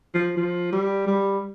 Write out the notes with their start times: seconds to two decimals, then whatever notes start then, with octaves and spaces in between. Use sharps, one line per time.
0.14 F3
0.37 F3
0.72 G3
1.07 G3